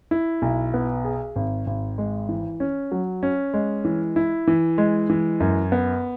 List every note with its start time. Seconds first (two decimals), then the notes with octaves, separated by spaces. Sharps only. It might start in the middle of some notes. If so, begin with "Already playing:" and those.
0.11 E4
0.42 B1
0.74 B3
1.04 G#4
1.36 G#1
1.67 G#1
1.98 G#3
2.29 E3
2.60 C#4
2.92 F#3
3.23 C#4
3.54 G#3
3.85 E3
4.16 E4
4.47 E3
4.78 G#3
5.10 E3
5.40 F#2
5.72 B3